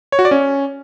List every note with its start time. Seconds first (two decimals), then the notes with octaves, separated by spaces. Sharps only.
0.12 C#5
0.19 F#4
0.25 D5
0.31 C#4